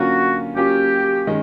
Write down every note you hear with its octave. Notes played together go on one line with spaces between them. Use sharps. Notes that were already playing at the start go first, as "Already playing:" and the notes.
Already playing: D3 F#3 A#3 C#4 F4 F#4
F#3 A#3 C#4 F4 G4
D#3 G#3 C#4